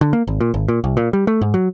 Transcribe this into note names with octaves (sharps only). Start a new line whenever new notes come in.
D3
A#3
G#1
A#2
G#1
A#2
C2
A#2
G3
A3
G#2
F#3